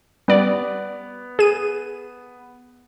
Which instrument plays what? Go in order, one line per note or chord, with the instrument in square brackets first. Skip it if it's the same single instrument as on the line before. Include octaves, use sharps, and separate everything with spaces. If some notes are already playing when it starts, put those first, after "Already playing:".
[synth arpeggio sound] G3 D5 [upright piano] B3
[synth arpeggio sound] G#4 D#7